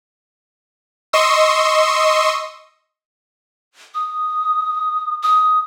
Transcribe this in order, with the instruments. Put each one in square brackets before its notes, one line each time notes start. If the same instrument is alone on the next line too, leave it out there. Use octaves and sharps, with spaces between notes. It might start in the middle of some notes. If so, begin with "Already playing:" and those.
[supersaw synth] D#5 C6 C#6 D#6 E6
[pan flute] D#6
D#6